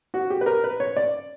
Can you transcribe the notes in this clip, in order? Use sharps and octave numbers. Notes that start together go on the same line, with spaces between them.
F#4
G4
B4
A#4
B4
C#5
D5